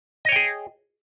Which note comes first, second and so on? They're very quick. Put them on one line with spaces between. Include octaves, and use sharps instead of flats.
D#5 C#5 G5 G#4